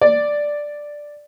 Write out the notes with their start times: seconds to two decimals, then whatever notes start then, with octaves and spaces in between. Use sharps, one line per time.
0.01 D5